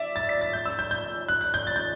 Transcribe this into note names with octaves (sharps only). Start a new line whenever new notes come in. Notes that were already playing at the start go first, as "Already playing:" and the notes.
Already playing: D5 E5
A6
B6
A6
G6
E6
G6
G6
F#6
F#6
G6
A6
G6